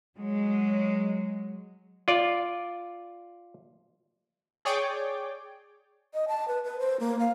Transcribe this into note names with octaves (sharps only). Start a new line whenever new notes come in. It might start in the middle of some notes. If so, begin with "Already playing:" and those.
F#3 G#3
F4 D5
G#4 C#5 D5 G5 D6
D#5
A5
B4
B4
C5
A#3
F5